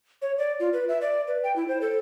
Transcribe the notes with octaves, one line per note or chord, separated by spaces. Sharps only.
C#5
D5
F4
B4
E5
D5
B4
G5
E4
C5
A4